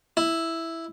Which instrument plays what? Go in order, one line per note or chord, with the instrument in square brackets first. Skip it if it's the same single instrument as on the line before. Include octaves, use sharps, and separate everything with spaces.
[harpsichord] E4